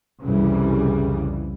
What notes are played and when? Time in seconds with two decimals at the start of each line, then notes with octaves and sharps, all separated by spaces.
0.23 C2 F2 C#3 E3 G3